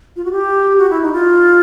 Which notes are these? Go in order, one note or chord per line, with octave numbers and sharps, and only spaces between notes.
F4
F#4
G4
F#4
E4
D#4
F4